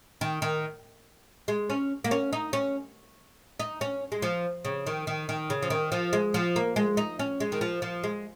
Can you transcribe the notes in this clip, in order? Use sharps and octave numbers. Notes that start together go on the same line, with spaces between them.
D#3
D#3
G#3
C#4
A#3
C#4
D#4
C#4
D#4
C#4
G#3
F3
C#3
D#3
D#3
D#3
C#3
F3
D#3
F3
G#3
F3
A#3
G#3
D#4
C#4
G#3
D#3
F3
F3
G#3